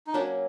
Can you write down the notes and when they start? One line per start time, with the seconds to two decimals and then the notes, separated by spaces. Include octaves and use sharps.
0.07 D#4
0.13 F#3 A#3 C#4 D4